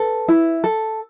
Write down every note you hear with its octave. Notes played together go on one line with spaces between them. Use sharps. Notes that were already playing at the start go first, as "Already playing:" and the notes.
Already playing: A4 B4
E4
A4